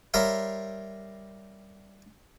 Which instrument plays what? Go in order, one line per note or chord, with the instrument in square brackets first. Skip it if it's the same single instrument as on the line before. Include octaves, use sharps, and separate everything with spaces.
[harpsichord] G3 A#4 C#5 E5 F5 C6